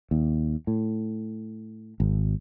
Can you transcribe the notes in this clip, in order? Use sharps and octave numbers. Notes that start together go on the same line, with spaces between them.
D#2
A2
G#1